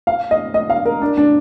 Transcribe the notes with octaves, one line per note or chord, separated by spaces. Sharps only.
F5
D#5
D#5
F5
A#4
D4
D4